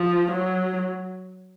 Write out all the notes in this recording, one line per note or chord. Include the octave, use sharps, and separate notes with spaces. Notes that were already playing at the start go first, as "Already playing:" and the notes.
Already playing: F3
F#3